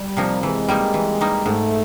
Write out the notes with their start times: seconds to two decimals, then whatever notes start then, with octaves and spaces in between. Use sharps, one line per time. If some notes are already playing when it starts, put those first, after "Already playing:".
Already playing: G3
0.17 C3 F3 A#3 D#4
0.43 E3 G#3
0.68 G3 A#3 D#4
0.94 E3
1.21 G3 A#3 D#4
1.46 G#2 A3